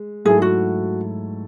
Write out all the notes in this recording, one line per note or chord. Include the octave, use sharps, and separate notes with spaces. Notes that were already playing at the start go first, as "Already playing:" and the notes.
Already playing: G#3
G#2 F#3 A3 E4 G#4 A4
F#4